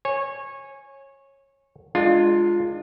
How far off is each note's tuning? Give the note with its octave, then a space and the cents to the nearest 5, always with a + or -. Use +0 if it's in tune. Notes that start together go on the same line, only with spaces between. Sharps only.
C#5 -20 G#5 +0
G#3 +0 D4 +25 F4 +0